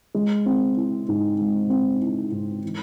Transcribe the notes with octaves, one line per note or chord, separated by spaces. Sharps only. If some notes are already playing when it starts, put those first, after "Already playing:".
G#3
C4
E4
G#2
G#3
C4
E4
G#2
E3